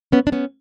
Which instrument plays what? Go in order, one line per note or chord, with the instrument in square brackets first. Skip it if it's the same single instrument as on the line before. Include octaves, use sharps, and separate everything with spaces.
[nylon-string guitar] B3 C#4
D4
B3 C#4